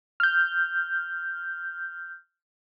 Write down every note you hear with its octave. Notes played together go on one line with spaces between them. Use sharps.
F6 G6